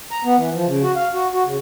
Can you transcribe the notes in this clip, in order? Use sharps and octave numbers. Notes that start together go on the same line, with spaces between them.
A#5
B3
E3
F3
C#3
F#4
F5
F#4
F#4
C#3